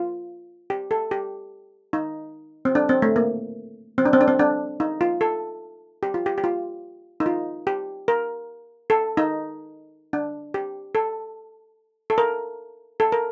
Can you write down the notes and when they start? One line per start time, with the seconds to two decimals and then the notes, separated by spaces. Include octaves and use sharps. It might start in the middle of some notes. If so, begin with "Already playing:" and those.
Already playing: F4
0.70 G4
0.91 A4
1.11 G4
1.93 D#4
2.65 C4
2.75 D4
2.89 C4
3.02 A3
3.16 A#3
3.98 C4
4.05 D4
4.13 C4
4.21 D4
4.28 C4
4.39 D4
4.80 D#4
5.01 F4
5.21 A4
6.03 G4
6.14 F4
6.26 G4
6.38 G4
6.44 F4
7.20 D#4
7.26 F4
7.67 G4
8.08 A#4
8.90 A4
9.17 D#4
10.13 D4
10.54 G4
10.95 A4
12.10 A4
12.18 A#4
13.00 A4
13.12 A#4